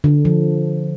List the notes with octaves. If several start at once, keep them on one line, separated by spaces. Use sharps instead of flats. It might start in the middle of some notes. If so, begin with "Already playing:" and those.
D3
F3